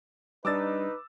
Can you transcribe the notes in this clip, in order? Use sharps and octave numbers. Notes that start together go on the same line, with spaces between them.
G3 D4 D#4 B4 D6 E6 A6